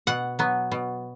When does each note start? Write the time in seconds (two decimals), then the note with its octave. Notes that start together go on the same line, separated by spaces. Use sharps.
0.07 B2 F#5
0.39 F#3 B3
0.72 B2